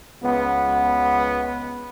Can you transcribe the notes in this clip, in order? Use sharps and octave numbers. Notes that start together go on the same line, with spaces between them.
C#2 B3